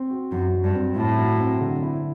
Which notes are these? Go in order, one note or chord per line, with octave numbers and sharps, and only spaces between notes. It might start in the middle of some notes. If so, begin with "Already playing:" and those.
Already playing: C4
F#4
F#2 F#3
F#3
G2
C4
A2 E4
F#3
C4
D3
E4